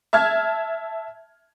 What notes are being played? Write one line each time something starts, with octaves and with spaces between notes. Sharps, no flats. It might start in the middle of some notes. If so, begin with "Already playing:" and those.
E5 A5 F6 G#6